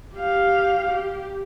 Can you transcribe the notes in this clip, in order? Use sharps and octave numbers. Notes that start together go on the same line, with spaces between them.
G4 F5
G4